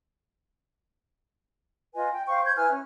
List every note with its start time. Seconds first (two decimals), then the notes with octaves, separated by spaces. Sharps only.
1.94 F4 B4 D#5 G#5
2.12 G5
2.26 C5 F5 G5 C#6
2.45 C5 G6 G#6
2.56 E4 B4 G#5 F6
2.71 C#4